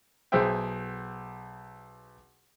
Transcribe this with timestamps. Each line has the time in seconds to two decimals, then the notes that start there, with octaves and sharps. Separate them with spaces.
0.32 B1 G#4 C5 E5 G5